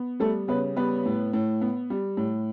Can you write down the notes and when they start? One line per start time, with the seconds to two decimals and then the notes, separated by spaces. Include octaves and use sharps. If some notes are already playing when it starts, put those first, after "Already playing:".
Already playing: B3
0.20 G3 A3 A4
0.48 C#3 B3 B4
0.76 G3 B3 B4
1.06 A2
1.33 A2
1.61 B3
1.90 G3
2.17 A2